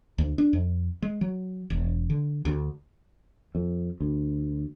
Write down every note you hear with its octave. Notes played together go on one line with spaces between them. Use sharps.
D2
D4
F2
G#3
F#3
E1
D3
D2
F2
D2